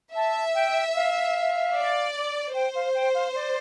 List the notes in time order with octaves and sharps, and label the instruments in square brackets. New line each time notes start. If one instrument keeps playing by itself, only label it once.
[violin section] E5 [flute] A5
[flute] G5
F5
[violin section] D5
[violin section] C5 [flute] G5
[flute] F5
G5
F5
D5